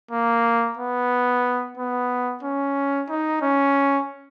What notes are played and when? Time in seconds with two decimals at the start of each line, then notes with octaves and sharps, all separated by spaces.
0.11 A#3
0.77 B3
1.77 B3
2.43 C#4
3.09 D#4
3.42 C#4